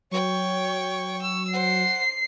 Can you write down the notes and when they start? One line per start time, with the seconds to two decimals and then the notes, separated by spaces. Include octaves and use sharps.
0.11 F#3 C#5 G5 C#6
1.22 C#6 E6
1.53 C5 F#5 C7